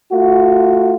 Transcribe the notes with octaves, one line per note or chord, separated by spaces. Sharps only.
A3 F4 F#4